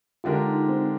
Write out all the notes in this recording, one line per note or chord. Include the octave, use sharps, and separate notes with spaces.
D3 G#3 D4 F4 G4 A#4
D#4
C4